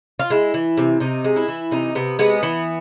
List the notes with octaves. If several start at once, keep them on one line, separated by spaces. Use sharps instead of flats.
F4
G#3 E4
E3
C3
C3 D#4
G#3
E4
E3
C3 D#4
C3 B3
G#3 B3
E3